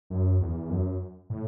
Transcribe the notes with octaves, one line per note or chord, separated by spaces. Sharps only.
F#2
E2
F#2
A2